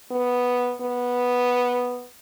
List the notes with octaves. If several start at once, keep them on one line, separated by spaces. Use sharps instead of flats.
B3
B3